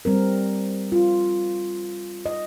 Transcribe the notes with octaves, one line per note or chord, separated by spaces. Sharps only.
G3 C4 A#4
F4
D#5